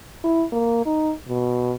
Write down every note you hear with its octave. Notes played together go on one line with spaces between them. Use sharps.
E4
A#3
D#4
B2